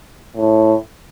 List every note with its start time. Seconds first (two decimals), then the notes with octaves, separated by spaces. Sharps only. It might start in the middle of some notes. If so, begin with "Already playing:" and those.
0.37 A2